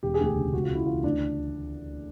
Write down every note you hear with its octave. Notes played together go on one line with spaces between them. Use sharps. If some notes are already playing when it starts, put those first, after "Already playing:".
E1 G4
G#4
D2 G4
C#3
C#2 F#4
F4
C#3 E4
E3 F4
D2 D4